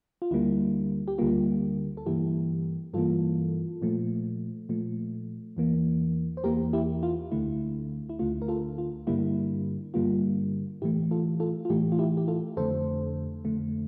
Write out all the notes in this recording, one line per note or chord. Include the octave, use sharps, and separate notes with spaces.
F4
D2 D3 G3 A#3 E4
G4
D2 D3 G3 A#3 F4
A4
G2 E3 A#3 E4 G4
G2 E3 A#3 F4 A4
A#2 F3 A3
A#2 F3 A3
E2 E3 A#3
C5
E2 E3 A#3 G4 A#4
E4 G4
F4
D2 D3 A3 E4
E4
D2 D3 A3 F4
A#4
F4 A4
F4
G2 D3 G3 A#3 E4
G2 D3 G3 A#3 F4
A2 E3 A3 E4 G4
F4 A4
F4 A4
F4
A2 E3 A3 E4 G4
F4
E4 G4
G4
F4 A4
F2 D3 A3 A4 C5
F2 D3 A3